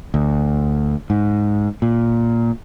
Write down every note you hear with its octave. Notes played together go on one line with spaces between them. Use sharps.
D2
G#2
A#2